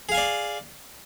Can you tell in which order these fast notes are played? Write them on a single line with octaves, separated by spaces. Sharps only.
G#4 F5 G#5 D5